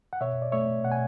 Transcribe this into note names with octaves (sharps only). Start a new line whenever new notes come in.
F#5
B2 C#5 E5
D5
A3 C#5 E5
B2 F#5
G#5